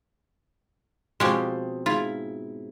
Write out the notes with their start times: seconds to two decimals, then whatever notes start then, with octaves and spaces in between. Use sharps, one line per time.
1.20 B2 F3 G#3 C4 C#4 G4
1.86 G#2 E4 F4